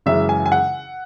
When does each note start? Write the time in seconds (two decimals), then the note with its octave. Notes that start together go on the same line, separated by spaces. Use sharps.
0.06 F#2 C#3 E3 G#3 E5
0.29 G#5
0.46 G#5
0.52 F#5